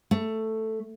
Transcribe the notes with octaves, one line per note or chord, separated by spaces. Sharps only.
A3